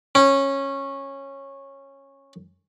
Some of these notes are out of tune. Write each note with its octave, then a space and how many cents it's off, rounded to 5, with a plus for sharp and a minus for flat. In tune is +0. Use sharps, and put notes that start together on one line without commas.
C#4 -15